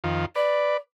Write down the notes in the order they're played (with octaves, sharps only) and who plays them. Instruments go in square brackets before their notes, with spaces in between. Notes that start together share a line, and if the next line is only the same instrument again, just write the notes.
[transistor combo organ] F2 D#3 F4
[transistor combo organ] B4 D6 [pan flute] D5